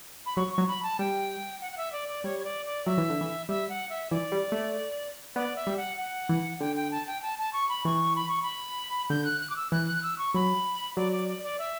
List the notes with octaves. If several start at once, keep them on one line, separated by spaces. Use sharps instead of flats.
B5
F#3 C#6
F#3 C#6
B5
A5
G3 G5
F#5
F#5
E5
D5
D5
G3 C#5
C#5
D5
D5
F#3 E5
E3
D3
E3
G3 E5
F#5
E5
E3 D5
G3
A3
B3 D5
E5
G3
F#5
F#5
E3
D3 G5
G5
A5
G5
A5
A5
C#6
B5
E3 C#6
B5
C#6
B5
D3 G6
F#6
F#6
D6
E6
E3 F#6
F#6
E6
C#6
F#3 B5
F#3 D5
D5
D5
D5
E5